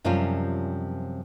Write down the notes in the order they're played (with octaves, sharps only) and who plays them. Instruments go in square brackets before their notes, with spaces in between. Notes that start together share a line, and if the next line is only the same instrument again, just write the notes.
[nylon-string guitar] F#2 C3 F3 G3 C#4 F4